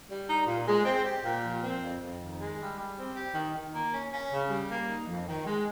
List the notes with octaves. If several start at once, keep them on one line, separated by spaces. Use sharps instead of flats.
G3
D#4
A#2
G#3
C4
G4
A#2
F3
C4
F2
F2
D#3
G#3
G3
G3
C4
G4
D#3
D#3
A#3
C#4
C#4
C#3
G3
A#3
D#4
F2
D#3
G#3